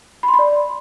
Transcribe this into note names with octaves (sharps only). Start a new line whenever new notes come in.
B5
C6
B5
D5